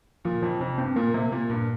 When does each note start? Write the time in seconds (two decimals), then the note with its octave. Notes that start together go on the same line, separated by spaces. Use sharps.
0.25 A#2 F3
0.42 F2 F3
0.60 F2 C3
0.78 G2 C4
0.96 A#2 A#3
1.14 C3 A#3
1.32 A#2 A#3
1.49 G2 A#2